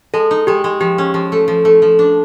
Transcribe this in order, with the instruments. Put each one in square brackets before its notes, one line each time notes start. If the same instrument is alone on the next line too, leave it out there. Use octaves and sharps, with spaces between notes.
[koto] G#3 [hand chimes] A4
[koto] D#4
[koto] G#3 [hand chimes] G4
[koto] G#3
[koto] F3 [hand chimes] G4
[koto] C#4
F3
A3
F3
A3
F3
D4